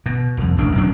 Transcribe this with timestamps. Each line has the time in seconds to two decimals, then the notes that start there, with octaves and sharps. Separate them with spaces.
0.06 B2
0.37 C2 F2
0.57 E1 A1 D4
0.74 E1 F#2 C#3 D4